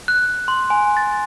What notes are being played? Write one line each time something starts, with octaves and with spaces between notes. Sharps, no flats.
F#6
C6
G#5
A6